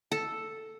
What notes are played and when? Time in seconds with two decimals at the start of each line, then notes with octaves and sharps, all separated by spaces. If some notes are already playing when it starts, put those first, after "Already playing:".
0.12 A4